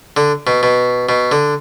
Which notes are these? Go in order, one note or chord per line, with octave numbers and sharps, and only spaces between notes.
D3
B2
B2
B2
D3